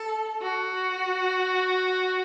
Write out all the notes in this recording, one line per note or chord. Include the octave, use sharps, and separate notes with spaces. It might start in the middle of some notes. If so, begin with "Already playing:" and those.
Already playing: A4
F#4